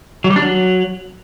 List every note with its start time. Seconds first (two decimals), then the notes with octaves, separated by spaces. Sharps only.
0.24 F#3
0.30 G3
0.36 D4
0.42 F#3